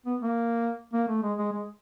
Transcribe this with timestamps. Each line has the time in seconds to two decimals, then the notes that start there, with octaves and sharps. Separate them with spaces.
0.06 B3
0.21 A#3
0.94 A#3
1.08 A3
1.23 G#3
1.38 G#3
1.52 G#3